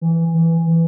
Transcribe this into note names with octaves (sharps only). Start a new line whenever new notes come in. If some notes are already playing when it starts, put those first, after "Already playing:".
E3
E3
E3